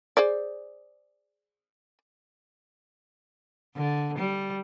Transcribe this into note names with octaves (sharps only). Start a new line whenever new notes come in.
G#4 C5 D5
D3
G3